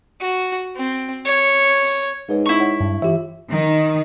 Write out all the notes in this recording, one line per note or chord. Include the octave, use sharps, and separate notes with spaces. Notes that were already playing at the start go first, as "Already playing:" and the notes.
F#4
C4
C#5
G#2 G#3 B4 C#5
E4 C#6
C#5 F#5
G2
E3 F4 G4 E5
D#3